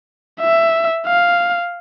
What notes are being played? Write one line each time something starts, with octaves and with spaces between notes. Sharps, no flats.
E5
F5